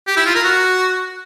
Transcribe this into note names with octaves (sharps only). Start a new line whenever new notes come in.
G4
E4
F4
A#4
F#4